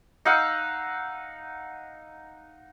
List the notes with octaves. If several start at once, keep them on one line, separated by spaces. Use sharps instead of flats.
D#4 F5 F#5 E6